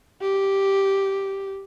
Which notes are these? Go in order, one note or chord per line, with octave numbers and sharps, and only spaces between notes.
G4